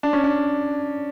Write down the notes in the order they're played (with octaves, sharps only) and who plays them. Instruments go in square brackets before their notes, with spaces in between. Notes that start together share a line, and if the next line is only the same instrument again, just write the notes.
[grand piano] D4
C#4
D4